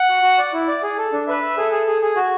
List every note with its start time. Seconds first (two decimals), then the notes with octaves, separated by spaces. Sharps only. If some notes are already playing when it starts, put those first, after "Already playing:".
Already playing: F#5
0.09 F#4
0.23 F#4
0.38 D5
0.53 E4
0.68 D5
0.83 G#4
0.98 A4
1.13 D4
1.27 B4 E5
1.42 E5
1.57 G#4 A4
1.71 G#4
1.87 G#4
2.02 G#4
2.16 F#4